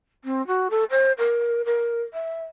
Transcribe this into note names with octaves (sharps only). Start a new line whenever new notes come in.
C4
F#4
A4
C5
A#4
A#4
E5